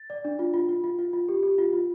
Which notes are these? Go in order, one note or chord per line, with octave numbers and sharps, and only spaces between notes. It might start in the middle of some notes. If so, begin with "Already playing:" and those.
Already playing: A6
D5
D4
F4
F4
F4
F4
F4
F4
G4
G4
F4
F4